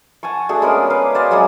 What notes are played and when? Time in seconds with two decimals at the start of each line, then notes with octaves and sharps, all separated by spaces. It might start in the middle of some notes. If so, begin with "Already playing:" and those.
0.23 F#5 G#5 A5 C#6
0.49 A3 D4 F#4 G#4
0.62 G#3 B3 C#4 A#4
0.90 B4 F5 D6
1.15 C5 D5 F5 G#5
1.31 F#3 G#3 B3 C#4